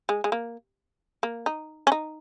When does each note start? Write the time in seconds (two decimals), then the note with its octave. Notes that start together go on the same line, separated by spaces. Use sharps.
0.09 G#3
0.24 G#3
0.32 A#3
1.23 A#3
1.46 D#4
1.87 C#4
1.92 D#4